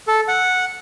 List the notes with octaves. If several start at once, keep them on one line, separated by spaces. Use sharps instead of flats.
A4
F#5